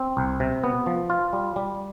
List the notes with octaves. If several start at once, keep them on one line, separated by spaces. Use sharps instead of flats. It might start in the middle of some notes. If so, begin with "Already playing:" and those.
Already playing: C4
C2
C3
B3
F3
F4
G3
G3